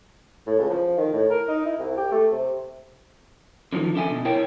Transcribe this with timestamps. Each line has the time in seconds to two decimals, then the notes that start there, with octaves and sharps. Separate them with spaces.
0.46 A2
0.58 C#2
0.70 F3
0.98 D#3
1.13 A2
1.30 A#4
1.48 D#4
1.65 E4
1.79 C2
1.97 G4
2.11 A3
2.32 C3
3.73 D3 D#3 F3
3.95 D4 A4 E5 G#5
4.10 B2
4.25 E4 A#4 C#5 G5